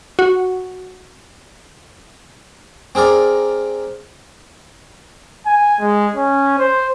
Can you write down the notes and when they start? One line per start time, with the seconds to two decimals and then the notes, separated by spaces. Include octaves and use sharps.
0.19 F#4
2.95 C4 G#4 A#4 D5
5.46 G#5
5.80 G#3
6.15 C#4
6.59 C5